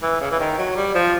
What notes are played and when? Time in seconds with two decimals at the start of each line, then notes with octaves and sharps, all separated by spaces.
0.02 E3
0.21 C#3
0.31 E3
0.39 D#3
0.58 F#3
0.76 G3
0.95 F3